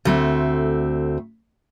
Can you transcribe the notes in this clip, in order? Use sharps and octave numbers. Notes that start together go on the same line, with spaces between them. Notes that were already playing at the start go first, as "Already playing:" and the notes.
D2 A3 C4